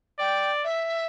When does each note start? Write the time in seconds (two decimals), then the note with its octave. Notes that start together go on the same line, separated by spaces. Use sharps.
0.19 D5 G5
0.64 E5